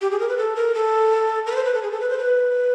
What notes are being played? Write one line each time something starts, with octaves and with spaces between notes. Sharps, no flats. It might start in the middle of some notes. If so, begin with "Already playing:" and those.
G4
G#4
A#4
B4
A4
A#4
A4
A#4
B4
C5
B4
A4
G#4
A4
B4
C5
B4